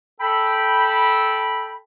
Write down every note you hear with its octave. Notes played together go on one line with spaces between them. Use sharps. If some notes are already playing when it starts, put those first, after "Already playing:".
A4 G5 B5